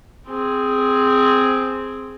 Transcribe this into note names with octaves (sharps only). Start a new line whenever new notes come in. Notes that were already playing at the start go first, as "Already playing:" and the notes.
C4 G#4